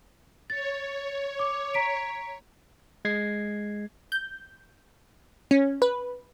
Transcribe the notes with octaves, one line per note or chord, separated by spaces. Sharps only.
C#5 A6
D6
A#5 B6 D7
G#3 G#6 C7
G6
C#4
B4